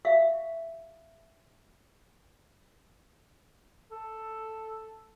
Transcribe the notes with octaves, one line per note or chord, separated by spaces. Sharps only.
G4 E5 F5
A4